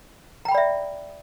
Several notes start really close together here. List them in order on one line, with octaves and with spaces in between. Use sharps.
A#5 G5 B5 D5 E5